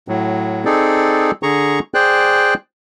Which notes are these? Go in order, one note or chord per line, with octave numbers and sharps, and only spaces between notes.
A2 F#3
C4 D#4 G#4 A4 D5
D3 G#4 A#5 C#6
G#4 C5 D5 G5 F#6